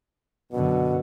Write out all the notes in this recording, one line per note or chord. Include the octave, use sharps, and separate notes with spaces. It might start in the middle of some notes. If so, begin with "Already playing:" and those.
F#2 B2 D3